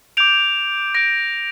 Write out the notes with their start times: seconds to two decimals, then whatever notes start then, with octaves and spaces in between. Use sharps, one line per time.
0.17 D6 G6 D7 F7
0.95 D6 G6 A#6 D7